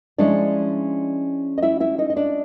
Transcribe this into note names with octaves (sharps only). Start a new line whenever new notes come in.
F3 G#3 C#4 D4 E4 D5
D#5
E4 E5
E4 E5
D#4 D#5
D#5
D4 D5